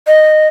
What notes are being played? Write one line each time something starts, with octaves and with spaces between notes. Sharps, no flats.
D#5